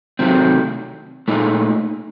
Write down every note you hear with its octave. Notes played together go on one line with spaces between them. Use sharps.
C3 D#3 F#3 A3 C4
A#2 A3 D#4